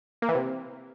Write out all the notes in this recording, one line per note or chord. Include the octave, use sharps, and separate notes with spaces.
A#3
E3
C3